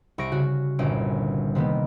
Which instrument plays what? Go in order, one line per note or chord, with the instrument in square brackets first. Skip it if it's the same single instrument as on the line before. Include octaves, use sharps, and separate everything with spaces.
[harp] C2 C#6 A#6 D7
C#3 F#4
G1 C2 A#2 C#4 D7
C3 D#3 A#3 B3